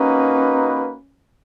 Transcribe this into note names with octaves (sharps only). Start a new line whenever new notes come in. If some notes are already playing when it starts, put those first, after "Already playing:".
Already playing: A#3 C#4 D#4 F#4 B4